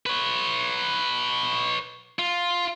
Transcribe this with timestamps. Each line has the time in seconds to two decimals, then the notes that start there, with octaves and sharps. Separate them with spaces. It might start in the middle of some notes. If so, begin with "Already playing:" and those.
0.06 B4 C#5
2.19 F4